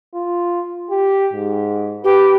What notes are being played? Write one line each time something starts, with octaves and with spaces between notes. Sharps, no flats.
F4
G4
G#2
G4 B4